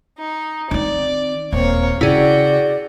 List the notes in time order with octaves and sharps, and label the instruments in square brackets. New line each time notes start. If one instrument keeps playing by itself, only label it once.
[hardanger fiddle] D#4
[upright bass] D#3 C4 [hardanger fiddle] D5
[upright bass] D#1 [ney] A#3 [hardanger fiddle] C4 C#5
[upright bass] C#3 [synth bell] E4 G#4 [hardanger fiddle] F#4 G5 [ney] D5